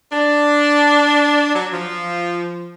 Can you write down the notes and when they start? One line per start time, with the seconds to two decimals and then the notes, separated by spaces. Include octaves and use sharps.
0.12 D4
1.55 F#3
1.73 F3